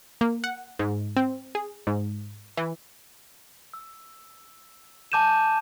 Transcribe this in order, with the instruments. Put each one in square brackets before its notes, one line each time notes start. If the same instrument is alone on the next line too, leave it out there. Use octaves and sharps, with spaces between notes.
[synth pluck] A#3
F#5
G#2
C4
G#4
G#2
E3
[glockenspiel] E6
G#5 A5 D6 G6 D#7 E7